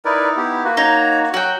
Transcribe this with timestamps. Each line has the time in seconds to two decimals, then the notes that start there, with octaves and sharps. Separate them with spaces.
0.05 D#4 E4 A#4 B4 D5
0.37 B3 G4
0.64 A#3 F#4 B4
0.77 D#4 C#5 A#5
1.34 F#3 F#4 G5